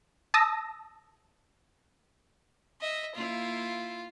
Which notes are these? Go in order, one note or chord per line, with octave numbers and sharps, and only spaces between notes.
A5 D#6 E6 A#6
D#5 E5
A#3 E4 F4